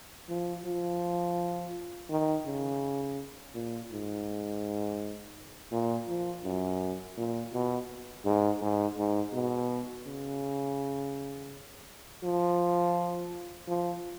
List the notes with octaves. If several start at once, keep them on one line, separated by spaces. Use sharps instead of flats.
F3
F3
D#3
C#3
A#2
G#2
A#2
F3
F#2
A#2
B2
G#2
G#2
G#2
B2
C#3
F3
F3